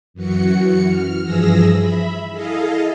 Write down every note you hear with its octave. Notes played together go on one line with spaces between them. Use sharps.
F#2 E3 F#4 C#7
F6
G2 E3 F3 G#4 E6 A#6
E5 B5
E4 G#4 A4 D#5 F5